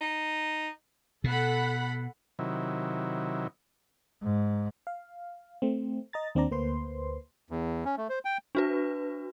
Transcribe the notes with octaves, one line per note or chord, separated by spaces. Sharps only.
D#4
B2 A4 F#5 B5
C3 D#3 F#3 E4
G#2
F5
A3 C4
D#5 A#5 A6
D#2 C4 D4 D5 A#5
D2 A#3 B4 C5 C6
E2
C#4
A3
C5
G5
D4 F#4 B4